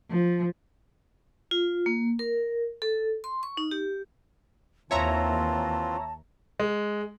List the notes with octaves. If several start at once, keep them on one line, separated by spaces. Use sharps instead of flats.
F3
F4
A#3
A#4
A4
C6
C#6
D#4
G4
D#2 E3 C4 F4 C#5 E5 A5 A#5
G#3